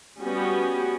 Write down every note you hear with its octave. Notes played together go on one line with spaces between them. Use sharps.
G3 B3 C#4 F#4 G4